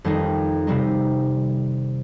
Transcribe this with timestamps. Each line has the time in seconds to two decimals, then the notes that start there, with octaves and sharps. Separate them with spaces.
0.04 F2 D#3 G3 C4 D#4
0.67 C3 G3 C4 D#4